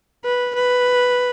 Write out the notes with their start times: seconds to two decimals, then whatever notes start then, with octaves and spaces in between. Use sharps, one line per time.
0.24 B4
0.55 B4